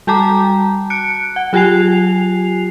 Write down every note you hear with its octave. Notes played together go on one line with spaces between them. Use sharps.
G3 F#4 G5 A5 A#5 D6
F#6 C#7 D7
F#5
F#3 F4 G4 G#5 C7 F7